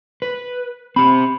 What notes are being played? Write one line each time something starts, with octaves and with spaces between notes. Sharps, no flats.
B4
C4 G4 B5